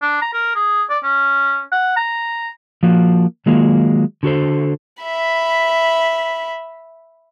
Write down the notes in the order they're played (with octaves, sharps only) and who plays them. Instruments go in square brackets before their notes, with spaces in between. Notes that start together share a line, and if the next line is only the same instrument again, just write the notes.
[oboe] D4
A#5
A#4
G#4
D5
C#4
F#5
A#5
[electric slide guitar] F3 A#3 F#4
D#3 F#3 G#3 A#3 F4
D3 F#4 A4 C5
[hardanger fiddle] E5 B5